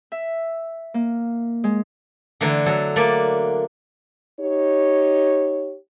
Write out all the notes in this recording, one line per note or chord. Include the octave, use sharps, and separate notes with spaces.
E5
A#3
G#3
D3 E3 A3 A#5
F#3 A4
A3 A#3 D5
D#4 G4 C#5